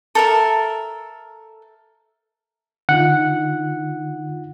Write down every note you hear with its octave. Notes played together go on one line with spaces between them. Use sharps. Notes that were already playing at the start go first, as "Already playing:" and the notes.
A4 A#4 E5
D3 D#4 F4 F#5